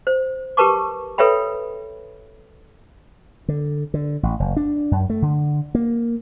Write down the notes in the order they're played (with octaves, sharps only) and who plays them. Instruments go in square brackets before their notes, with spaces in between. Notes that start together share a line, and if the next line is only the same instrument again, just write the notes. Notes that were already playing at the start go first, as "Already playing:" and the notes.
[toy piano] C5
G4 A#4 B4 A5 C#6 D6
A4 B4 C#5 E5 G5 B5
[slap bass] D3
D3
A1
F#1
D4
F#2
A3
D3
A#3